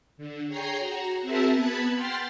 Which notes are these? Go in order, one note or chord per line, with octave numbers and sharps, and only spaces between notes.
D3
G#4 C#5 G5 A#5 C7
F#4 A#5
C4 F#4 G#4 A#4 E5 A5
B3 B4 A5 B5 G#6
F#5 G5 C6 F6 A6 C7